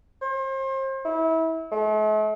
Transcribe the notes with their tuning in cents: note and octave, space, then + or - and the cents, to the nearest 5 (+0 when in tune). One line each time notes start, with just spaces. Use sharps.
C5 +35
E4 -30
A3 -45